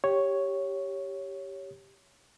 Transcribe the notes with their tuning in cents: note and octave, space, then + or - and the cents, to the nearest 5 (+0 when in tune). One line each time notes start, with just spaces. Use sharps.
G4 +0 C#5 +0